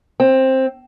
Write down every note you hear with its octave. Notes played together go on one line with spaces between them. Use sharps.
C4